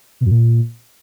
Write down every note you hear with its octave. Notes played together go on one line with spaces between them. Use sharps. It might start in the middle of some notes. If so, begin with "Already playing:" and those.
B2
F#2
A#2